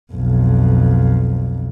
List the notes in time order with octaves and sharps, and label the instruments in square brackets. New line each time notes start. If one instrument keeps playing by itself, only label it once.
[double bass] B1 F2